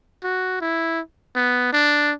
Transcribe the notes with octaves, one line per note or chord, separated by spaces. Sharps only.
F#4
E4
B3
D4